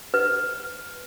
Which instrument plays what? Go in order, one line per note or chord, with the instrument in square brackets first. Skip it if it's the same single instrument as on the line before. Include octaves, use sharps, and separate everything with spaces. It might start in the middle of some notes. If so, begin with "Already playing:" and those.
[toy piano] B4